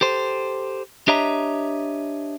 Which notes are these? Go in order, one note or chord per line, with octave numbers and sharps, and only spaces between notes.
G4 A4 C5
D4 G4 C#5 D#5 E5 A#5